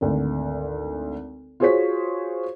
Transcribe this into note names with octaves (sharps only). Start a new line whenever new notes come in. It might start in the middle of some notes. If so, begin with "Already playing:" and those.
G#1 D2
F4 F#4 G#4 C5 C#5 B6